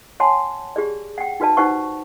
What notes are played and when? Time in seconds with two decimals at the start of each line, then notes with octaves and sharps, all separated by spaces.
0.20 C#5 F#5 G#5 A5 C6
0.76 G4 G#4 D5
1.18 F#5 G5
1.40 D#4 F#4 B4 D5 A5
1.57 D#4 G4 B4 C5 F#5 C#6